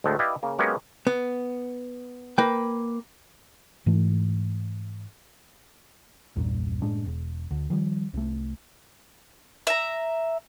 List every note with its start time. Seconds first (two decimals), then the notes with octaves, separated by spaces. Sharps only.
0.04 D2 A2 G#3 A3
0.19 E4 G4 B4 D5 D#5 F5
0.43 C#3 A#3
0.59 F#3 G#3 A#3 B3 C#4 G4
1.07 B3
2.38 A#3 B4 G5
3.86 G#2 E3 A3
6.36 A#1 E2 G2 A#2
6.82 F#1 A2 G#3 D4
7.06 E1
7.51 D2
7.70 D#3 F3 G3
8.14 C2 A3
9.67 E5 A#5